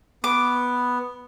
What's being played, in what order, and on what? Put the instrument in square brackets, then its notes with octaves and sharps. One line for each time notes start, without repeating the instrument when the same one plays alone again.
[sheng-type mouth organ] B3 [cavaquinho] D6